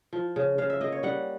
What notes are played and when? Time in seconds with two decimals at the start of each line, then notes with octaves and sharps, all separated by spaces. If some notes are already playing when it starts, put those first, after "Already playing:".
0.13 F3
0.36 C#3
0.58 C#3 F5
0.70 E5
0.81 A#3 D#5
0.92 C#5
1.03 G3 F#5